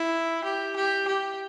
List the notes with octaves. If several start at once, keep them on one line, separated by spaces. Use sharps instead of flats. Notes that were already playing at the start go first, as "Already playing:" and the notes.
Already playing: E4
G4
G4
G4